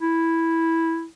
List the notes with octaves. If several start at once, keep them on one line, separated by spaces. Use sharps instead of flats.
E4